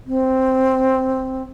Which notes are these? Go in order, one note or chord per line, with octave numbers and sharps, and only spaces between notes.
C4